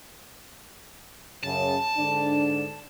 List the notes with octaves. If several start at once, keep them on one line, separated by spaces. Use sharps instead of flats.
F#2 C#3 A5
G#2 D3 D4